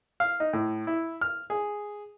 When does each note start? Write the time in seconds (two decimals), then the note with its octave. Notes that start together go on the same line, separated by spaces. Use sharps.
0.20 F5
0.40 D#4
0.53 A2
0.87 E4
1.21 F6
1.50 G#4